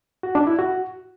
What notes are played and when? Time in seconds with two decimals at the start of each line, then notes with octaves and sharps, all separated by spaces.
0.23 F#4
0.35 D4
0.47 E4
0.59 F#4